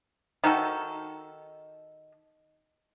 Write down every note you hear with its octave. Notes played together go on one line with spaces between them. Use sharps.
D#3 D#4 F#4 A4